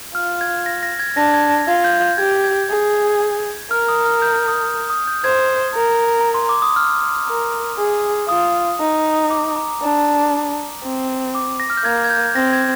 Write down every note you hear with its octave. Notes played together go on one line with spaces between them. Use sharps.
F4 F6
G#6
A#6
A#6
G#6
D4 A#6
G#6
A#6
F4 G#6
G6
G6
G4 G#6
G#6
G#4
A#4 F6
D#6
F6
G6
D#6
D#6
G6
C5 G#6
A#4
A#5
C6
D6
D#6
F6
A#4
G#4
F4 D#6
D#4
D6
A#5
D4 A#5
C4
D6
A#6
F6
G6
A#3 G#6
G#6
G6
C4 A#6
G#6